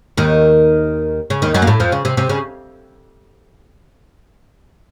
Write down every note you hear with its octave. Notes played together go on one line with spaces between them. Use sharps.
D#2 D#3
C#3
D#2 D#3
F#2 F#3
A#3
A2 A3
F2 F3
C#3
C3
C3
C#3